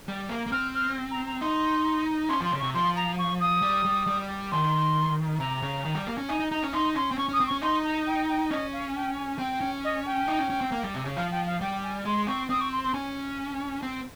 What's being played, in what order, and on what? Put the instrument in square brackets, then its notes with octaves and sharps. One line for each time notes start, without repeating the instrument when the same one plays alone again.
[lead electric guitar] G3
A#3
A#3
[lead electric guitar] C4 [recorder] F6
[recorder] F6
A#5
A#5
[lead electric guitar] D#4 [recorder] C6
[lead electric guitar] C#4 [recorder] C6
[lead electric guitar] F3 [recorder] C6
[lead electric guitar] C#3
[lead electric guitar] C3 [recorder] C#6
[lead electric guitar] F3 [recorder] C6
[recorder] A#5
C#6
D#6
[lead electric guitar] G3
G3
G3
[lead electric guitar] D#3 [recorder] C6
[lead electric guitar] C3 [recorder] A#5
[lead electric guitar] C#3
D#3
G3
A#3
C#4
[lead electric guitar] D#4 [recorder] G#5
[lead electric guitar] D#4
[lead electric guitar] D#4 [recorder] A#5
[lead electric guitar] C#4
[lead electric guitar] D#4 [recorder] C6
[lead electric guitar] C#4 [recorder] C6
[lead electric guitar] C4
[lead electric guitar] C#4 [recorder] C#6
[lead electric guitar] C#4 [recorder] D#6
[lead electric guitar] C4
[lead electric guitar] C#4 [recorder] C#6
[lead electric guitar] D#4 [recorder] C6
[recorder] A#5
G5
G5
[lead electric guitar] C#4 [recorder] D#5
[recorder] F5
G5
G#5
[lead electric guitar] C4 [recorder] G5
[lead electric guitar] C#4
[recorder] D#5
G5
[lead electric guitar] D#4
C#4
C#4
C4
A#3
G3
C3
C#3
[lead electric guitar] F3 [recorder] F5
[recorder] G5
F5
[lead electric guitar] G3 [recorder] G5
[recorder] G#5
[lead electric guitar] G#3 [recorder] C6
[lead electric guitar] C4 [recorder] C#6
[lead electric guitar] C4 [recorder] D#6
[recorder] C#6
C6
C6
[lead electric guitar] C#4 [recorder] G#5
[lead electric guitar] C4